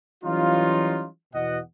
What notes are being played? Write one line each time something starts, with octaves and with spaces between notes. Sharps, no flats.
E3 F#3 G3 C#4 D#4 F4
E2 B2 D#5 F#5